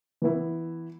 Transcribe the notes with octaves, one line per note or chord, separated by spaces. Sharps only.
E3 B3 E4